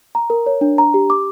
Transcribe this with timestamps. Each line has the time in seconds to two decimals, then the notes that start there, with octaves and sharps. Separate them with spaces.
0.15 A#5
0.30 A#4
0.46 C#5
0.61 D4
0.78 A#5
0.94 G4
1.10 D6